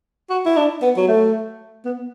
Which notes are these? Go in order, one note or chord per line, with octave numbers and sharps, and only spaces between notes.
F#4
E4
D4
B3
F#3
A3
B3